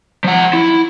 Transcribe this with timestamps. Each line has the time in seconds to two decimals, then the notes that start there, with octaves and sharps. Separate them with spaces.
0.24 F3 F#5
0.53 E4